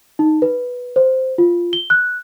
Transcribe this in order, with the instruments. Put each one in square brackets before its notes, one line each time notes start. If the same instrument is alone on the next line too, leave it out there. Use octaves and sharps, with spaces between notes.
[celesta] D#4
B4
C5
F4
G7
F#6